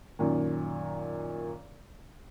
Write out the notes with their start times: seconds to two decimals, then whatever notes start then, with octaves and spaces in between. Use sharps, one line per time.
0.19 F#2 A#2 D#3